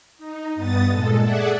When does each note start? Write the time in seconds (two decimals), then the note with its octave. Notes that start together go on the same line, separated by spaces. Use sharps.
0.17 D#4
0.55 G2 B3 D#6 A6
0.90 A#2 G#3 A4
1.20 G#4 A4 D5 E5 F#5